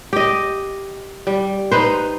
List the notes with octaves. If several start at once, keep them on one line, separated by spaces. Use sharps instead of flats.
G4 D#5
G3
D#4 B4 C5